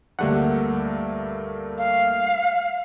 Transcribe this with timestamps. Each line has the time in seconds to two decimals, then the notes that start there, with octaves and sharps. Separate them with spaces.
0.19 D2 G2 G3 A3 A#3 F#5
1.78 F5